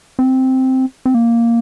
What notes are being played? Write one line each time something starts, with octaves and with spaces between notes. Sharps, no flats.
C4
C4
A#3